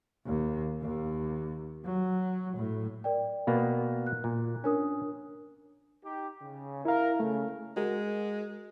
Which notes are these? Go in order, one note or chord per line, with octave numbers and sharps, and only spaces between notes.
D#2
D#2
F#3
A2
A#4 D5 G5
B2 A#3 B3
F#6
A#2
C#4 D4 A#4 D#6
D#4 G4
C#3
E4 A#4 F5
C#3 A3
G#3 F#4 A#4